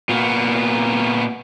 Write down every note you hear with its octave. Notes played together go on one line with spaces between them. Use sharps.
A#2 B3